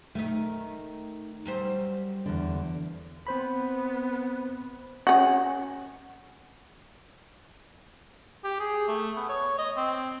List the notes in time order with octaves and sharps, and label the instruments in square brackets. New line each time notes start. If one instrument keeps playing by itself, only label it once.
[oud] D#3 D#4 [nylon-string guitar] A3
[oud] F#2 G3 C5
[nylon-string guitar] E2 D3
[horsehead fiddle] B3 [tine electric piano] C4 C5 B5
[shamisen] C#4 F#4
[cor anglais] G4
G#4
A3
B3
C#5
D#5
C4